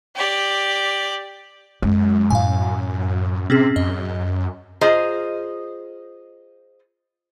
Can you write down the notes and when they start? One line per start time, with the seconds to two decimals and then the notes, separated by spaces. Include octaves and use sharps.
0.16 G4 D5
1.82 F#2 G#3
2.30 A2 F5 G#5
3.50 C3 C4 C#4 G#4
3.76 F#2 D#5
4.81 F4 G#4 C5 D#5 A#5